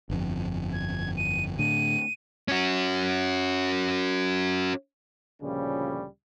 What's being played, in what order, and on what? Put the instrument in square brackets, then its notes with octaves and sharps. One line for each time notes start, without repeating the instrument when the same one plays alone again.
[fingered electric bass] G1 F2
[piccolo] G#6
D#7
[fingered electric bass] A2 D3 [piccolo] D#7
[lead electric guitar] C#4 F#4
[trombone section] D2 A#2 C#3 F3 G3 C#4